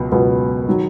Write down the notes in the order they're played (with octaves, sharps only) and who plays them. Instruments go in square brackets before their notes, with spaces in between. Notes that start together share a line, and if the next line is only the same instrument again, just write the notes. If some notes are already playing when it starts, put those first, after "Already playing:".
Already playing: [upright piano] C#2 B2 F#3 B3
C#2 B2 F#3 B3
D#3 F#3